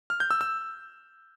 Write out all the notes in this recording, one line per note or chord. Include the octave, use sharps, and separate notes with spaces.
F6
G6
E6
E6